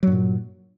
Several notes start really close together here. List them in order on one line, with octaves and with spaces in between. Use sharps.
F#3 G2 A#2